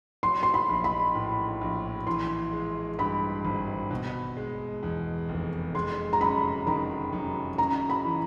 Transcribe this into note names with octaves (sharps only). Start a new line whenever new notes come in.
F#3 C6
C6
B5
A#1
B5
A2
A#1
E3 C6
G#3
G2 B5
G#1
B2
G#3
E2
F1
G#3 C6
A#5
F#2 B5
D#3 A#5
F#2
C#3 A#5
B5
E3